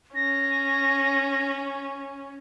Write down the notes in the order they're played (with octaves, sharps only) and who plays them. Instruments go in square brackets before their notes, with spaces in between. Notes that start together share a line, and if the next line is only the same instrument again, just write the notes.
[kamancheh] C#4 [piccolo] A#6